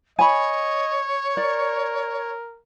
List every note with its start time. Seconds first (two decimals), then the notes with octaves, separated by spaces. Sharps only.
0.19 C#5 D#5 G#5 B5
1.37 A#4 D5